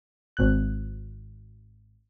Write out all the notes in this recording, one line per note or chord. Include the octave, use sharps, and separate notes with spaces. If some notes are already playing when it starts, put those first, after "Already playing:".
G#1 F#6